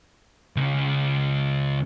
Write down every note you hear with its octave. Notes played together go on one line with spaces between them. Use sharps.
C#2 C#3